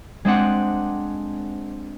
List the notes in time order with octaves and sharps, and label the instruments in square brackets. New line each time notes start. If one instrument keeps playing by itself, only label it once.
[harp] G#3 C4 D4 F#5